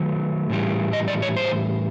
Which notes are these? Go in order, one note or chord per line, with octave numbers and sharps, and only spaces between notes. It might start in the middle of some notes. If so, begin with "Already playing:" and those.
Already playing: D#3 F#3 A3
A2 E3 G3
D#5
D5
C#5
C5